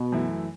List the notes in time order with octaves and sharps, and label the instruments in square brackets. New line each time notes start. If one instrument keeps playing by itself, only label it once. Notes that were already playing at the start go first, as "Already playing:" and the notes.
Already playing: [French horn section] B2
[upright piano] F#2 E3 A3 E4